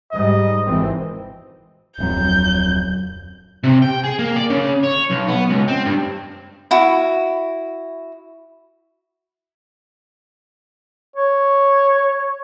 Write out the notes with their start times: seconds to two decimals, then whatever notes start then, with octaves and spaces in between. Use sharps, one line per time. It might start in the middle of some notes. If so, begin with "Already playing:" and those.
0.12 G#2 G3 D#5
0.63 G#1 E3 C4
1.98 D1 F2 F#3 G6
3.64 C3
3.82 G5
4.04 G#4
4.19 A#3
4.36 D5
4.50 C#3
4.84 C#5
5.10 B1
5.28 B3
5.49 C#2
5.68 C4
5.86 G2
6.71 E4 F#4
11.16 C#5